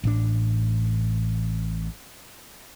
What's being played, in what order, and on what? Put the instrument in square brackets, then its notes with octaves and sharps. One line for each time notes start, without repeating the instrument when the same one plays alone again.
[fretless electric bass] A1 A2 D4